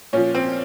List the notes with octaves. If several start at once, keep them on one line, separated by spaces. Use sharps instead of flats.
A#2 F3 C#4
C4